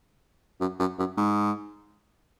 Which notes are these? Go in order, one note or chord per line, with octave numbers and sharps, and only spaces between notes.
F#2
F#2
F#2
G#2